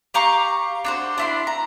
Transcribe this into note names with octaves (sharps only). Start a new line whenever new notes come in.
G4 F5 A#5 C#6
D4 F#4 C5
D4 E4 C6
A#5